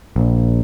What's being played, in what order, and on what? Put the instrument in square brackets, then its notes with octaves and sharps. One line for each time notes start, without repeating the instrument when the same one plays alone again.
[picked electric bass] A#1